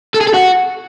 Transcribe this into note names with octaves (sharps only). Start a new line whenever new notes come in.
A4
G#4
A4
F#4